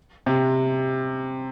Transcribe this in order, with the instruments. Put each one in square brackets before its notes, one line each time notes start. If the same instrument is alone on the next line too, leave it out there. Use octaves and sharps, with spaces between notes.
[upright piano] C3